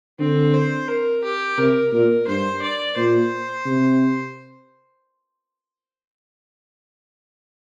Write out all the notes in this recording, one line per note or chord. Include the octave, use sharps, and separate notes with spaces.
D3 C4
C5
A#4
G4
C3 A#4
A#2 A#4
G2 C5
D5
A#2 C5
C3